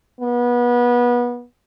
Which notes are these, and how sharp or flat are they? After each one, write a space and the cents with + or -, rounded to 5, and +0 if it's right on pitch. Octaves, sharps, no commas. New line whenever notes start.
B3 -25